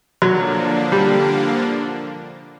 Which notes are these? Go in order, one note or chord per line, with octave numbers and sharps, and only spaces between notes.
D3 F3 F#3 A#3 D4
G3